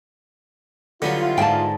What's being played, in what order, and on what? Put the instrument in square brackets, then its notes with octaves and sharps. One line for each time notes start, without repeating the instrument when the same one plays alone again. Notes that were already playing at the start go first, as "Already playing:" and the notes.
[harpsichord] D3 [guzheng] F#3 G3 B3 [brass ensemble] E4 F4
[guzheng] G#2 D5 D#5 [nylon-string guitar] G5 A5